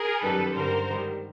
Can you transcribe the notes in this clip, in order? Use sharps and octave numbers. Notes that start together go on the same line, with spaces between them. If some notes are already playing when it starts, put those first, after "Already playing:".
Already playing: G#4 A#4
F#2 D#3 G3 A4 B4
G2 D3 G3 A#4 C5
G#2 D#3 G3